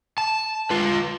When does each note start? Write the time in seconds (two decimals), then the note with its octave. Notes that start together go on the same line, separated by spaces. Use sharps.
0.18 A5
0.70 F4 B4